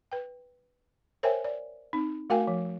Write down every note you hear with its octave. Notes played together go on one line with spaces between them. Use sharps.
B4 G5
A#4 C5 C#5 E5 G5 G#5
D5
C4 D#4
A3 F#4 A#4 F5 G5 G#5
F3